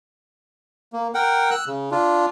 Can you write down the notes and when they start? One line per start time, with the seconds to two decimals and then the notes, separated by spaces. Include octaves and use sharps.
0.93 A#3
1.14 A#4 F#5 G5
1.51 E6 F#6
1.67 C#3
1.91 D4 F4